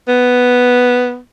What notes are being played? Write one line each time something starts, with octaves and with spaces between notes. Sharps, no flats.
B3